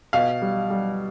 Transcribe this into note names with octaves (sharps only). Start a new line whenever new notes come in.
B2 F5
G3
G3